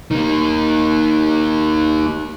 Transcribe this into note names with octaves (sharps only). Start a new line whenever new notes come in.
D#3 A#3